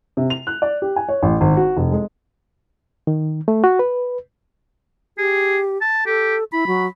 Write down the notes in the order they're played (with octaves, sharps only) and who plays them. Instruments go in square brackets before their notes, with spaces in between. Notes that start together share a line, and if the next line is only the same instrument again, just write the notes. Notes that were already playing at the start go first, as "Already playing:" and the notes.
[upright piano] C3
F7
F#6
D5
G4
G#5
C#5
A1
G#1
F#4
F1
G#3
[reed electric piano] D#3
A3
F#4
B4
[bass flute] G4 [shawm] G#4
[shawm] A5
[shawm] G4 [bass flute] A4
[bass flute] E4 [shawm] B5
[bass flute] F#3